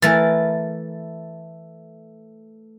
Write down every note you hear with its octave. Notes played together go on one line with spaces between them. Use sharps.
E3 A3 A#4 A6